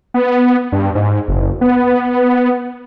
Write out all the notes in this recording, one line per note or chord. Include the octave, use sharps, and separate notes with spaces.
B3
G2
G#2
F#1
B3